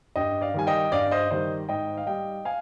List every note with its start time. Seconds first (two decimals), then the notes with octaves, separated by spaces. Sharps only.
0.16 G2 D#5 G5
0.41 D5 F5
0.54 D#3 G3 G#5
0.67 D#5 G5
0.92 G2 D5 F5
1.12 C5 D#5
1.31 D#3 G3 C5 D#5
1.69 G#2 D#5 G5
1.97 F5
2.07 G3 D#5 G5
2.45 F5 G#5